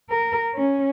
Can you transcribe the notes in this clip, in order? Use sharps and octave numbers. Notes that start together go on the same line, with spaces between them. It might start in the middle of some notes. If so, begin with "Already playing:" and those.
A#4
C#4